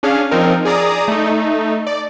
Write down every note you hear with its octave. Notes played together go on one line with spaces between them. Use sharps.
C#4 D4 G#4 F5
F3 C4 D#4 A#4
G#4 D5 A#5 D#6
A3 D#4
D5